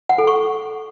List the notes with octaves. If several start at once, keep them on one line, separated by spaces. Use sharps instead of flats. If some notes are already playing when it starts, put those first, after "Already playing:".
F#5
A4
C#6